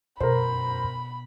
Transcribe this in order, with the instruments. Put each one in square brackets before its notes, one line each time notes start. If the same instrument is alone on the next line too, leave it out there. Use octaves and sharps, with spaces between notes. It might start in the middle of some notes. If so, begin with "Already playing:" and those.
[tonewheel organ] F#2 [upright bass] B2 [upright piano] A#4 C5 [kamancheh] B5